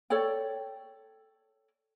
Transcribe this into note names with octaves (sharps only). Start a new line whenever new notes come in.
A4 C#5 D5 G5